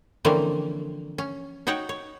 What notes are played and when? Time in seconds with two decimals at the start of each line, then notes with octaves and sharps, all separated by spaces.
0.25 D3 E3 F3 A#3 C4 C#4
1.18 C#4
1.67 D#4 F#4 C#5 F#5 G5
1.89 C#5